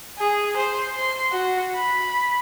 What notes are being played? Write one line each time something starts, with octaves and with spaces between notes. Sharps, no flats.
G#4
C5
C6
F#4
B5